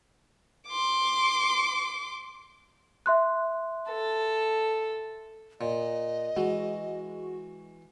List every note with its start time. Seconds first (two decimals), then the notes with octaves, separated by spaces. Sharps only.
0.67 C6 D6
3.06 E5 C6 F#6
3.89 A4
5.61 A#2 D#5
6.37 E3 G#3 F#4